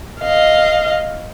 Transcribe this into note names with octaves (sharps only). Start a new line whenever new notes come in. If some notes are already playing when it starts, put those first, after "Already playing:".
D#5 F5